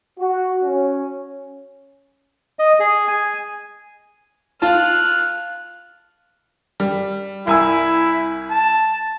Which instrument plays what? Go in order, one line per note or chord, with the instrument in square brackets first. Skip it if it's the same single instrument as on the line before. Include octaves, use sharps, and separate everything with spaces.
[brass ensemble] F#4
C#4
[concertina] D#5
G#4
G#5
[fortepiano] F4 A5 [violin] F6 F#6
[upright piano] G3
[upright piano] C2 G#5 E6 [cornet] E4
[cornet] A5